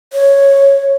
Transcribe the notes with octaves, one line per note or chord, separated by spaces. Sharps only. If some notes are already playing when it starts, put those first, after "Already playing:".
C#5